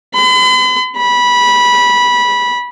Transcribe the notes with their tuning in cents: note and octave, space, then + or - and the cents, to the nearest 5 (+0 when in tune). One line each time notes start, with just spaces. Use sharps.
B5 +45
B5 -15